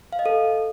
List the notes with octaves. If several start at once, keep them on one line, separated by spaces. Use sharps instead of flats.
F5
D#5
A4